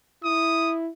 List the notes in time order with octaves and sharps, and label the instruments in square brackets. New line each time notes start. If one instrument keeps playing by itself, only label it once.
[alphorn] E4 [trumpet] D#6